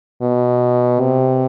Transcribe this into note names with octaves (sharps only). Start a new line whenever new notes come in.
B2
C3